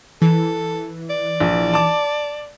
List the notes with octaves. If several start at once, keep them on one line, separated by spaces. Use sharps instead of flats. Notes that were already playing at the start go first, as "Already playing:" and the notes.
E3 A4
D5
A#1
A5 D6